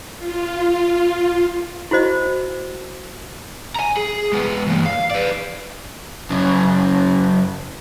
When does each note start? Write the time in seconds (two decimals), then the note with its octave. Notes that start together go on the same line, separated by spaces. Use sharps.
0.18 F4
1.91 E4 F#4 C5 D#5
3.75 G#5 A#5
3.97 G#4
4.33 G#3 B3
4.67 E3 A#3
4.86 F5
5.10 B4 D5
6.30 F#2 C#3